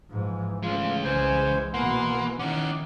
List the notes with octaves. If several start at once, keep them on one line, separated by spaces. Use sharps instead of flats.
G#2 E3 F3
G#3 A3 C#4 F4
C2 C#3 G#3 C5 G#5
B2 A#3 B3 F#5 C6
D#3 C#4 E4 F#5 D6